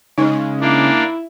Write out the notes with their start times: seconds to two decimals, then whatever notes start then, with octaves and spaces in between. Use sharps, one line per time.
0.18 C#3 G#3 D#4
0.61 A#3 D4 E4